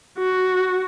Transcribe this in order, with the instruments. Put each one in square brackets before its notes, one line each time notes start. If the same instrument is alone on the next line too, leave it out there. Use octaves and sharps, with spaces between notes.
[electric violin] F#4